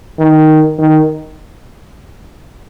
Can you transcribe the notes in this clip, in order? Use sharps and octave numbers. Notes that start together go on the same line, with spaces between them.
D#3
D#3